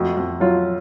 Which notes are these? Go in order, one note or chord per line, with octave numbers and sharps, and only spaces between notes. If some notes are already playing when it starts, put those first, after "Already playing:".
Already playing: F2 A3 F#4
F2
F#3 F4